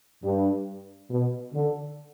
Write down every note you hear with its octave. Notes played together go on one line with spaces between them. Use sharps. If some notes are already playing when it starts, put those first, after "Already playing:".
G2
B2
D3